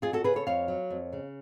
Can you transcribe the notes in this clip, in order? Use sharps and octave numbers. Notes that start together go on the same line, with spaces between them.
F2 F4 G#4
F#4 A4
C#3 G#4 B4
A4 C#5
F2 C#5 F5
F#3
F2
C#3